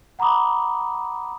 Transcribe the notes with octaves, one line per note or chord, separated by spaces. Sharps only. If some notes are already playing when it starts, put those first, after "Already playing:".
F#5 A#5 B5 D6 D#6